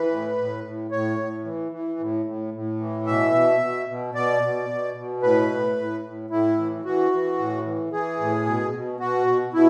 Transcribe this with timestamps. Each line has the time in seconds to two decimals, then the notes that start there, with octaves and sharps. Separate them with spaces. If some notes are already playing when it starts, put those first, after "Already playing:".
Already playing: E3 B4
0.11 A2
0.38 A2
0.65 A2
0.91 A2 C#5
1.19 A2
1.45 E3
1.72 E3
1.99 A2
2.26 A2
2.54 A2
2.80 E3
3.07 B2 E5
3.34 B2
3.61 B2
3.89 B2
4.14 B2 D5
4.43 B2
4.70 B2
4.96 B2
5.22 A2 B4
5.50 A2
5.77 A2
6.04 A2
6.30 A2 E4
6.58 E3
6.85 E3 F#4
7.12 E3
7.39 A2
7.65 E3
7.92 E3 G#4
8.20 A2
8.46 B2
8.74 B2
9.00 B2 F#4
9.27 B2
9.54 B2 E4